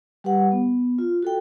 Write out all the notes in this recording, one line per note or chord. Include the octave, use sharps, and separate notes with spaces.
G3 G4 B4 F#5
B3
F4
F#4 A4 G5